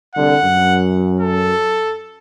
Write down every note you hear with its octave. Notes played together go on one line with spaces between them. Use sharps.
C2 D3 F#5
F#2
A4